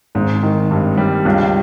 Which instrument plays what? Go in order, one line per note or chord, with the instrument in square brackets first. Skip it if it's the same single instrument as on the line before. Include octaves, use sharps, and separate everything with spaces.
[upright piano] G#1 [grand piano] G#2
[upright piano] D#3
G2
G3
[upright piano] C#2 [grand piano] G2